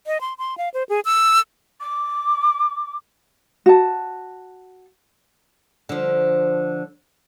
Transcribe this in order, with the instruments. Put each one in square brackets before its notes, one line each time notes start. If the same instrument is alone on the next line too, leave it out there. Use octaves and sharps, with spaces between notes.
[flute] D#5
C6
C6
F5
C5
G#4
E6
[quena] D6
[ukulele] F#4 A5
[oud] D3 F3